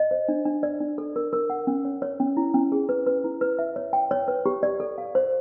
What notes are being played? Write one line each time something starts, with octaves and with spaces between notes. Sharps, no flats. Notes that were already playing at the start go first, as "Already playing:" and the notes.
Already playing: D#5
C5
D4
D4
D5
D4
A4
A#4
A#4
F#5
C#4
C#5
C#5
C#4
E4
C#4
G#4
B4
B4
E4
B4
E5
C#5
G5
C#5
B4
G4
D5
A4
F5
C5